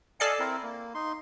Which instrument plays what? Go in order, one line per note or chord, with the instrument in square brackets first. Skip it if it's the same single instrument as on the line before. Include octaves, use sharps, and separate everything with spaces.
[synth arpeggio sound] A4 D5 C7 [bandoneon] D#5 F5 G#5
[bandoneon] C4 E4 A#4
A#3
D#4 C6